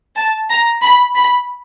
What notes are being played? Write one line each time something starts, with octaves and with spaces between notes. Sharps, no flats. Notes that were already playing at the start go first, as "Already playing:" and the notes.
A5
A#5
B5
B5